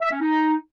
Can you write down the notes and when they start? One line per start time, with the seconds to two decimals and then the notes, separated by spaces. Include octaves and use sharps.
0.02 E5
0.11 C#4
0.21 D#4